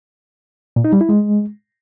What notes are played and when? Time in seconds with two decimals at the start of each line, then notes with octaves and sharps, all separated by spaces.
0.76 A#2
0.85 D#4
0.93 G3
1.01 E4
1.09 G#3